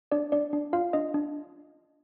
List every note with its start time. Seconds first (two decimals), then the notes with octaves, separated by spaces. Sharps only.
0.12 D4 D5
0.32 D4 D5
0.53 D4
0.73 F4 F5
0.93 D4 D#5
1.14 D4